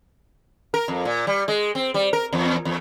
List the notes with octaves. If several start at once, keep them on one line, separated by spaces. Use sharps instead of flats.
A#4
F2
A#2
G3
G#3
C4
G3
A#4
E2
E2